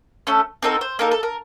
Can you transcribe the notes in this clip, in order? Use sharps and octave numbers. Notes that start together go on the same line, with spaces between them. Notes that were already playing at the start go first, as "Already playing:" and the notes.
A3 C#4 A4
C4 D#4 F#4 A4 A#4
C5
A#3 D#4 A4 A#4
A4
A#4